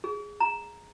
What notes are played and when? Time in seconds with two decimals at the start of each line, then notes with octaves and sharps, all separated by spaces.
0.04 G#4
0.40 A#5